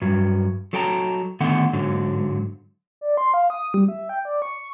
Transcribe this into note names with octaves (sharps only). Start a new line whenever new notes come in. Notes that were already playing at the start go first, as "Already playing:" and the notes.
G2 F#3
F#3 A4 G5 A5 A#5
D3 D#3 A3 B3 F#5
G#2 D3 F#3
D5
C6
F5
D#6
G3
E5
G5
D5
C#6